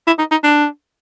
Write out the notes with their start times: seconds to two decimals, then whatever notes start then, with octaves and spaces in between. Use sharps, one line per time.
0.07 E4
0.18 D#4
0.31 D#4
0.43 D4